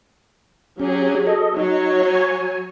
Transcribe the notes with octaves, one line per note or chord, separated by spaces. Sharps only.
F#3 C#4 G4 G#4
A4 D#5
F#3 D#4 C#5
G#5